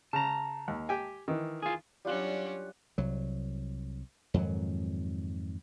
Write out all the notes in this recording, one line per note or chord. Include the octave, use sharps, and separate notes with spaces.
C#3 A5 A#5
D#2
G4 G5 G#5
D#3 E3
F4 G#4
F#3 G3 C#4 D4 F4 F#5
C2 F#3
F2 G#2 D#3 F#3